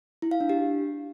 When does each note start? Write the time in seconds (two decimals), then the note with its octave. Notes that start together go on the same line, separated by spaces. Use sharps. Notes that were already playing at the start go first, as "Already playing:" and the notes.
0.22 E4
0.31 F5
0.40 D4
0.49 G4